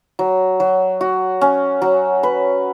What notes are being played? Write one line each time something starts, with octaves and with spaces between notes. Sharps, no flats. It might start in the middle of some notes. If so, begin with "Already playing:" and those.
F#3
F#3
F#4
C#4
F#3
B4